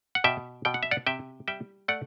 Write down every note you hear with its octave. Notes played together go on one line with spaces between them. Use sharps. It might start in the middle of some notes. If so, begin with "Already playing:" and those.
F#5
B2 E5 G5
B2 G5
F#5
E5
D5 F#5
C3 E5 G5
G3 E5 G5
A3 D5 F#5